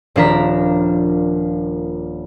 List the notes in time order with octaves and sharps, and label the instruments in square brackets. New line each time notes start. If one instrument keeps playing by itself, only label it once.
[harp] D#1 F3 D4 A#4 A#5 B6